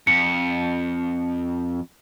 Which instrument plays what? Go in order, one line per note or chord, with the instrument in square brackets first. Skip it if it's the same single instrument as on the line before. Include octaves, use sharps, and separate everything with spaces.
[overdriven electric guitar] F2 [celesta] C#7